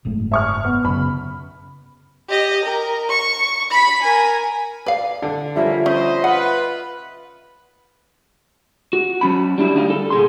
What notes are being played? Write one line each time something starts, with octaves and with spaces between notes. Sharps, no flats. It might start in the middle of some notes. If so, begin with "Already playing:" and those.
F#1 G#2 A3
E5 C#6 F6
B3
F#2 C#3 B5
G4 D#5
A#4
C#6
B5 B6
A#4 G#5
B4 D5 F5
D3
D3 F3 G3 A#3 C#4 E5
C#4 C5 D#5
F4 B4 F#5
F#4
F#3 C#4 B5
G3 D4 E4 F#4
D2 G3 D#4 F5
A4
A#2 G#4 C6